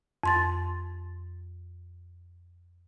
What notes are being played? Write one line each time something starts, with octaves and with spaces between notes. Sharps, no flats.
F2 C6 A6